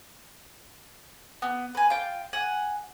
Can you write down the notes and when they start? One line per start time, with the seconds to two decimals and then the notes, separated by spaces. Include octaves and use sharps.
1.42 B3
1.75 B4 G#5
1.90 F4 G5
2.33 F#5 G#5